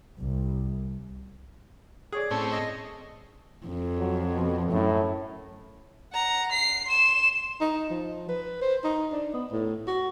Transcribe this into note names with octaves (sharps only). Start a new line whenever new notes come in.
C2
G#4 C#5 D5
A2 C4 C#4 A4
D#5
F2
F#3
B2
F#2 A2
F#5 A#5
C7
C6 E7
D#4
F3
B4
C5
D#4
D4
B3
A2
F#4